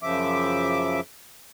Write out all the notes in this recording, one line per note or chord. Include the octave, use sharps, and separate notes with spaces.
F#2 C#3 F3 E5 D6